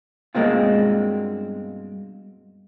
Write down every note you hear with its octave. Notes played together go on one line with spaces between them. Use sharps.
G2 B2 G#3 A#3 C4 F4